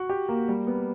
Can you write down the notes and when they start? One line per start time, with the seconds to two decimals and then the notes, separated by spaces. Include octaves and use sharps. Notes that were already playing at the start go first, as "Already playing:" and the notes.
Already playing: F#4
0.09 G4
0.29 A#3
0.49 G3
0.67 B3